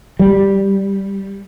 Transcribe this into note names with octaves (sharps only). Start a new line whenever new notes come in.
G3